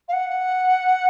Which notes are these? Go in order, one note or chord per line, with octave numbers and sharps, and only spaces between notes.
F5
F#5